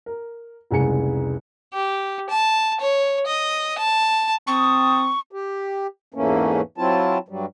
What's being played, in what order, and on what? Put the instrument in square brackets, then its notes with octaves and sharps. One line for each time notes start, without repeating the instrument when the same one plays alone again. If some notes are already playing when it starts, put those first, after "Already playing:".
[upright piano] A#4
F1 C2 C#3 G#3 G#5 C#7
[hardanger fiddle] G4
A5
C#5
D#5
A5
[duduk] C4 [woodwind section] G5 A5 D#6 [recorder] C#6
[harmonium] G4
E2 G#2 E3 A3 A#3 C#4
F#3 C4 E4 F4 A5
G2 F#3 G3